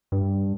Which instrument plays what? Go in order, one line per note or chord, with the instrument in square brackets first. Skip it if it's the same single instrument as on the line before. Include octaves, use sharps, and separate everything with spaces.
[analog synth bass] G2